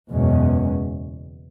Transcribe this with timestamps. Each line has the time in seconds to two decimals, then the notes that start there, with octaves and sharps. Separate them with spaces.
0.10 F#1 E2 B2 G#3 C#4